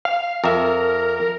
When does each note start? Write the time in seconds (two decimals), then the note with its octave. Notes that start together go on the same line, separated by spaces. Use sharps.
0.05 F5
0.44 F2 A#4 E5